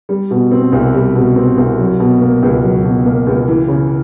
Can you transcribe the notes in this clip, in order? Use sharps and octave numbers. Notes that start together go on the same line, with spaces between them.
G3
B2
C4
C2
G3
B2
C4
C2
F#3
B2
A#3
C#2
F#3
B2
A#3
C#2
E3
C#3